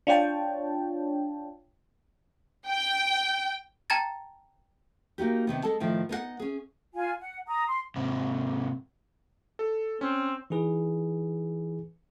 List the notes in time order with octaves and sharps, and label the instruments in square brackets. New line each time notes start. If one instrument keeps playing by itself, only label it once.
[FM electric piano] D4 F4 C#5 G5 A5
[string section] G5
[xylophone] G5 A5 A#5 G#6 A6
[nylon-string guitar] A#3 D#4 F#4 G4
C3 D#3 B3
G#3 A4 A5
A2 D#3 F3
B3 D#4 G#4 F#5
C#4 G#4
[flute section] F4 G#5
F#5
A#5 D#6
C6
[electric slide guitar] G#2 C3
[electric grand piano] A4
[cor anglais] C4 [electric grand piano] C#4
[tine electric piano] E3 D#4 G#4 B4